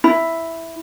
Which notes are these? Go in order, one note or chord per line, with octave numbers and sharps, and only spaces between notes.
E4